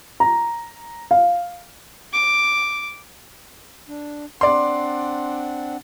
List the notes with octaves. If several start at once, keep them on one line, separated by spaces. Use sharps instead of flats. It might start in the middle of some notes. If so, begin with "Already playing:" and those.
A#5
F5
D6
D4
C4 D4 D5 F#5 C6